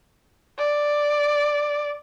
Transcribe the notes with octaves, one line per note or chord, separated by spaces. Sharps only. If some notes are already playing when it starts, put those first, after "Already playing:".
D5